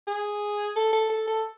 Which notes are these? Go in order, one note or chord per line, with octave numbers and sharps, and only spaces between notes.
G#4
A4
A4
A4
A4